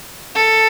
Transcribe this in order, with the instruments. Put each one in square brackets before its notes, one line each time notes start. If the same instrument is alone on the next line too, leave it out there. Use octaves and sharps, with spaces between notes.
[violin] A4